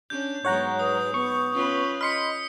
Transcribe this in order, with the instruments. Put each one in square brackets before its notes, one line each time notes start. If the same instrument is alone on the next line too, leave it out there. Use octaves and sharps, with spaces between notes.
[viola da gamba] C#4 D4 [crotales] G6
[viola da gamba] G#2 F#3 G#3 [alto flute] B3 [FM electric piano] C#5 F#5 A#5
[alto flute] B4 [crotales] D#6
[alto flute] B3 [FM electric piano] C#6
[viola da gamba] C#4 F4 B4
[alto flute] D#5 [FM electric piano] B5 C6 [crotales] F6 B6 C#7